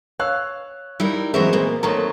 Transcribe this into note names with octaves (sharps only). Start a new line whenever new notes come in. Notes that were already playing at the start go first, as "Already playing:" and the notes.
C#5 F5 E6 F#6
G3 D#4 E4 A#4
E3 F#3 G#3 B3 C4 F#4 A#4 E5
A#2 A#3
D#3 F#3 A3 A#3 C4 C#5 A#5